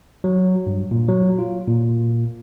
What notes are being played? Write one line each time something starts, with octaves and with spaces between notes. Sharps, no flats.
F#3
G2
A#2
F#3
F4
A#2